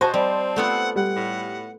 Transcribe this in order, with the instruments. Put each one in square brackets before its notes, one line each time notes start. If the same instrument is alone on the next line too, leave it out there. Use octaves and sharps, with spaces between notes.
[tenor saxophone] F#4 [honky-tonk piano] C5 A5 [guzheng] D#5 G#5
[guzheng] G3 [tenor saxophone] C4
[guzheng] A3 B3 F4 [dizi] F#5
[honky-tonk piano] G3 [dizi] F#5
[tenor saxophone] A2